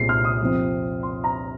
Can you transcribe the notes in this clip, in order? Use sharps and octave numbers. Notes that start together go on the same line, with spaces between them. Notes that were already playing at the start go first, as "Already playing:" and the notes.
Already playing: C2 A#2 G#3 C4 C7
F6
D#6
F2 C3 F3 C4
C6
A#5